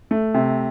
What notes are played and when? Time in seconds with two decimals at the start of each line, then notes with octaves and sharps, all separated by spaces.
0.11 A3
0.34 C3